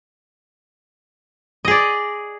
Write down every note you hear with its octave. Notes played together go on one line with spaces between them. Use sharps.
G#4 D5 D#5